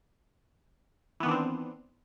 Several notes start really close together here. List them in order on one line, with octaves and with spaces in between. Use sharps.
E3 B3 D#3 D4 C4